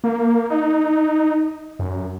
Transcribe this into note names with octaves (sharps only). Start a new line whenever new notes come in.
A#3
D#4
F#2